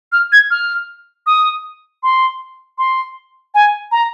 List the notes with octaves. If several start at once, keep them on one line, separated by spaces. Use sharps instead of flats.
F6
G#6
F6
D#6
C6
C6
G#5
A#5